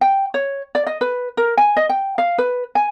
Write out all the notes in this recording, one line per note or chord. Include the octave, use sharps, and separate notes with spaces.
G5
C#5
D5
D#5
B4
A#4
G#5
D#5
G5
F5
B4
G#5